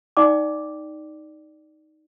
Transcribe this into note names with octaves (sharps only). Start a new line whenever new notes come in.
D#4 D5 G5 D6